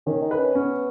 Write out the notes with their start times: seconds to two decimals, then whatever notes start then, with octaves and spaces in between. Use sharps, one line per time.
0.07 D#3 C#4
0.22 D#4
0.31 B4
0.39 C#4
0.55 B3 C#4